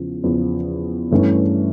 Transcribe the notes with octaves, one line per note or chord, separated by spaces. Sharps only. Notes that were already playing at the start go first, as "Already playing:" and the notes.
Already playing: E2 C#3 F3
E2 C#3 F3
G2 E3 A3 C#4